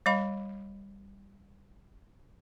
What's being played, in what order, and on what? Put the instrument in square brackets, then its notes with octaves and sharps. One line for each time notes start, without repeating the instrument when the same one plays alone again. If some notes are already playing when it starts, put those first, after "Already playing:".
[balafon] G3 D#5 F5 B5